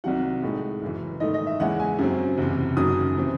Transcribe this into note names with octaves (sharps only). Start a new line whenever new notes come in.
C2 C3 D#3 F#3 F#5
A2 G#3 D#4
F#1 F#2 E3
G#2 D#3 A3 D#5
D#5
E5
E2 C#3 G#3 C#4 E4 F#5
G#5
F#2 C#3 F#3 C4
F#1 E2 C3
F#1 F#2 D#3 F#3 D#6
C3 E3 C4